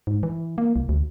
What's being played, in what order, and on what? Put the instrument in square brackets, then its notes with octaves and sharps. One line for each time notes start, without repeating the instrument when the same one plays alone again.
[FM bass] G#2
E3
A#3
C2
D2